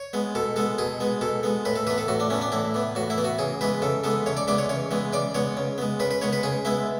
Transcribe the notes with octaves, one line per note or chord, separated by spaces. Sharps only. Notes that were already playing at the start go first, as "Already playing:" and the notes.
Already playing: C#5
G#3 B3
B2 A4
G#3 B3 A4
B2 G#4
G#3 B3
B2 A4
G#3 B3
A2 B4
A4
E3 B3 B4
A4
A2 F#4
D4
E3 B3 C#4
D4
A2 E4
E3 B3
A2 F#4
E4
E3 B3
F#4
C#3 G#4
E3 G#3 B3 B4
C#3 A4
E3 G#3 B3 A4
C#3 C#5
D5
E3 G#3 B3 D5
C#5
C#3 C#5
E3 G#3 B3
C#3 D5
G#3 B3 C#5
C#3
G#3 B3
C#3 B4
B4
G#3 B3 C#5
B4
C#3 G#4
G#3 B3 E4